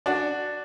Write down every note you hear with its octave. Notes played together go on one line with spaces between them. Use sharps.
D4 F#4